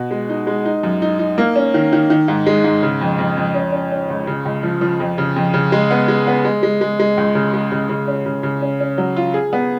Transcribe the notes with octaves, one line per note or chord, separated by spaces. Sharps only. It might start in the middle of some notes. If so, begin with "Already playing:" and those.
Already playing: B2
G#3
D#4
G#3
D#4
F#2
D#4
D#4
A#3
C#4
D#3
D#3
D#3
G#2
G#3
G#2
C#3
F2
F2
F2
C#4
C#4
C#4
C#2
C#3
C#2
F3
F3
F2
C#3
F2
C#3
G#3
B3
G#3
B3
G#3
G#3
G#3
G#3
C#2
C#3
G#3
C#3
C#3
C#4
C#3
C#3
C#4
C#4
F#3
F4
G#4
B3